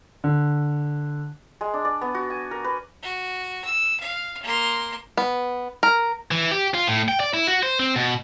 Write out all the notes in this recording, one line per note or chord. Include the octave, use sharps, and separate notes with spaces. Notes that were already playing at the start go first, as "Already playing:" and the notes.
D3
G#3
D4
D5
B3
F#4
G#5
A#4
B4
F#4
E6
F5
A#3 C6
B3
A#4
E3
G4
F4
A2
G5
D5
E4
F#4
C5
C4
B2